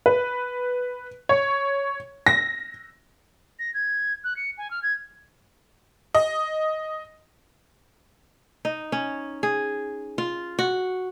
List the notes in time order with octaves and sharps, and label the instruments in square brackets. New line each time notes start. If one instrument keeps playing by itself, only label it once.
[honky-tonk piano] B4
C#5
A#6
[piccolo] A#6
G#6
F#6
C#7
G#5
F6
G#6
[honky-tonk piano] D#5
[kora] D#4
C#4
G#4
F4
F#4